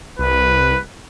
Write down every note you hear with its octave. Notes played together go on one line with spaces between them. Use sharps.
C2 B4